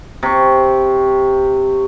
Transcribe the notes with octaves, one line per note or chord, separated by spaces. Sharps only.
C3 C#6